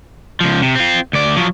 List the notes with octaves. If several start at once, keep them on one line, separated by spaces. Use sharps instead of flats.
C#2 F3
C3
C4 F4
D2 D5
F3 F#3